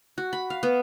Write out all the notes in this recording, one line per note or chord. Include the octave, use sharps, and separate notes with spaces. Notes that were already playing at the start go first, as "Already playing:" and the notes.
F#4
B5
F5
B3